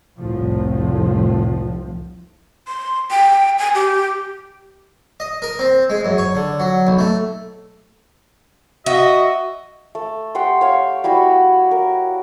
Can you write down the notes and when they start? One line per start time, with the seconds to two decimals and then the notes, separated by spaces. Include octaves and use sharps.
0.20 F1 C2 A2 F3
2.68 C6
3.11 G5
3.58 G#5
3.75 G4
5.20 D#5
5.42 A#4
5.59 C4
5.90 G#3
6.05 F#2
6.18 C#5
6.35 D3
6.60 F#3
6.87 B1
6.99 A3
8.86 F#4 D#5 E5
9.95 A3
10.35 G4 F#5 G5 C6
10.61 C#5 F5
11.04 G3 E4 F#4 B5
11.71 A#4